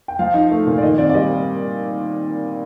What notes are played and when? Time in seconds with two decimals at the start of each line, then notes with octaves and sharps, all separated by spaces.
0.08 G5
0.19 F3 F5
0.34 D#4
0.51 A3
0.66 A#2
0.78 D5
0.82 D#3 D#5
0.98 C4 D5
1.09 D5
1.15 G3 D#5